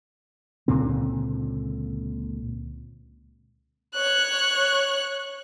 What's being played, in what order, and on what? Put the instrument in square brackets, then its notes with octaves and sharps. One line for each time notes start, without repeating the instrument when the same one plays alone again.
[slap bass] C#2 A#2 D3 C4
[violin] C#5 F#6